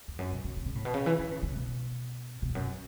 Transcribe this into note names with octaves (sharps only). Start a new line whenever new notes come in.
E2
F#2
B2
B2
B2
C#3
A2
B2
C#3
E3
E3
C#3
C#3
B2
B2
E2
F#2